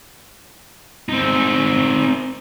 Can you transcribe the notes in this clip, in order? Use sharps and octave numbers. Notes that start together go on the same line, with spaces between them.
C4 D#4